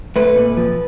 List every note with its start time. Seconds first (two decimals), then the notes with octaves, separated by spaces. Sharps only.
0.16 A3 B4
0.36 A#2
0.57 F3